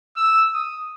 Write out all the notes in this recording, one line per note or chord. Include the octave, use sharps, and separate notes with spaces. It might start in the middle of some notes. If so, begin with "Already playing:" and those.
E6
D#6